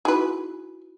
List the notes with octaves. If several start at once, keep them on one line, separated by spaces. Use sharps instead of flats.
D#4 E4 F#4 G#4 B4